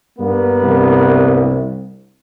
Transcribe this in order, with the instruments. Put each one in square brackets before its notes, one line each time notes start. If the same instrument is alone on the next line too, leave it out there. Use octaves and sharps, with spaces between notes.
[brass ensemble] G2 A#3 B3
[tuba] C2